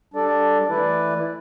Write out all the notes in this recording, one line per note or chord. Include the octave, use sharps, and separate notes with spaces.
G3 D4 A4 D5
E3 A3 E4 B4 D5